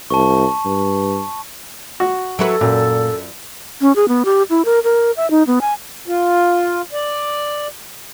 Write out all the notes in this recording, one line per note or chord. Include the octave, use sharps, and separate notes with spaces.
C2 A5 C#6
G2
F#4
F#3 E4 A4 B4
F#2 A#2
C#4
G#4
B3
G4
E4
A#4
A#4
E5
D#4
B3
G#5
F4
D5